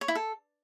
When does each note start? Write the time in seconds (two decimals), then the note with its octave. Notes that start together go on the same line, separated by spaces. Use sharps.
0.01 C#5
0.08 E4
0.15 A4